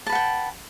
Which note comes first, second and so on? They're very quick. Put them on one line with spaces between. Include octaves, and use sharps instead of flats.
A5 B4 F#5 G5